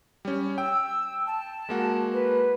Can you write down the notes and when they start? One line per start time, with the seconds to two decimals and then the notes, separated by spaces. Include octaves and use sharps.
0.25 G3 C#4
0.58 G5 E6
1.27 A5
1.69 G#3 A#3 F#4
2.13 B4